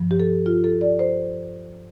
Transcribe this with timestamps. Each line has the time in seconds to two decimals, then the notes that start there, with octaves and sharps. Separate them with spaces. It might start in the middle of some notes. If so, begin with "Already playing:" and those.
Already playing: G2 F3
0.11 G4
0.20 A4
0.46 F4
0.64 A4
0.81 D5
0.99 C5